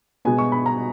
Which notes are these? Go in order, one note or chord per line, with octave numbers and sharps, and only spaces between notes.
B2 G#3 B3 G#5
C#6
B5
A#5